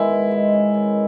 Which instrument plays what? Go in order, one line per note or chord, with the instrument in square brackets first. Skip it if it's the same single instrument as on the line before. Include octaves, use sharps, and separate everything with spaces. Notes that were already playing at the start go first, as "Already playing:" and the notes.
Already playing: [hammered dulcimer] D#3 G#3 B3 [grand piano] E4
[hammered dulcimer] G#2
G#3
C#4
D#3